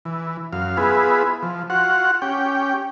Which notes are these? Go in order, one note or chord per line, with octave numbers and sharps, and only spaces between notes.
E3
F#2 F5
B3 E4 F4 G#4 B4
F3
F4 F#4 F#5
C#4 G4 G5